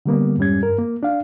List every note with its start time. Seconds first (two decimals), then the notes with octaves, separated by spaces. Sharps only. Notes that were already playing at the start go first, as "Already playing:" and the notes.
0.06 D3 G3 A#3 B3
0.38 F2 G#2 G3 C#4 G#6
0.63 G2 A#4
0.78 A#3
1.03 D4 F5